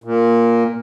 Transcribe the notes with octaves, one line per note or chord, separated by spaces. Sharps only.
A#2